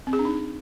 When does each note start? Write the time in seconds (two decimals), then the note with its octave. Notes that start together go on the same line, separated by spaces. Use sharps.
0.07 C4
0.13 G#4
0.19 D4
0.25 D#4